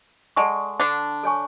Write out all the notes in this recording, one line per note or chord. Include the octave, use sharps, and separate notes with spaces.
G#3 A4 D5 F#5 A5 C#6
D3 D4
A4 C#5 G#5 C#6